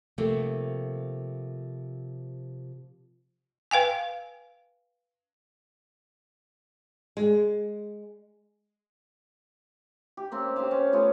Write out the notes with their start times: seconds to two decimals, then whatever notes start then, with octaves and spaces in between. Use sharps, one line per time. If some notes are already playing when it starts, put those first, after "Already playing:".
0.18 C3 F3 A3 A#3
3.71 B4 F5 G5 G#5
7.17 G#3
10.17 G4
10.31 A#3 C4 C#4
10.56 G4 B4 C5 F5
10.71 C#4
10.93 A3 B3 C#4 F4